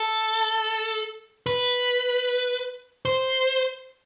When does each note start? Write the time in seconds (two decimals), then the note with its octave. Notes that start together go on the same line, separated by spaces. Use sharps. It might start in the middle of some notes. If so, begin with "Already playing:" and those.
Already playing: A4
1.46 B4
3.05 C5